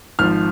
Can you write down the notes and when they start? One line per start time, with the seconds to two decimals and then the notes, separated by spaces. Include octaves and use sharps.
0.19 G#1 G#2 F3 F6